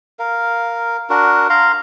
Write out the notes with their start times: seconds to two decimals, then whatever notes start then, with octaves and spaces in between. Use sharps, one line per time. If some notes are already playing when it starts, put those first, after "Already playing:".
0.19 A#4 F5
1.10 D4 F#4 A#4
1.50 F5 A#5 C6